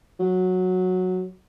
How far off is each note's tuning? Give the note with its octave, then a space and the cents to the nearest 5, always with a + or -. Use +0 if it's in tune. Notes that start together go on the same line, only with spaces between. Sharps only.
F#3 -10